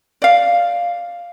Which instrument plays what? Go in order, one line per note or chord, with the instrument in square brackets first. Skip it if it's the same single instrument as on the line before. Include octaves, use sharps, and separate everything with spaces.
[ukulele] D5 F5